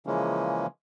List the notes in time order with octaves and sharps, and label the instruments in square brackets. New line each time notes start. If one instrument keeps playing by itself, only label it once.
[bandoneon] C#3 E3 F3 G#3 A#3 C#4